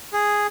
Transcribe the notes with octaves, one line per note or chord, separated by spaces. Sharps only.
G#4